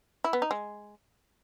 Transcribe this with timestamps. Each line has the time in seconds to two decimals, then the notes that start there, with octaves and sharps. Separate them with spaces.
0.24 E4
0.33 B3
0.42 D#4
0.51 G#3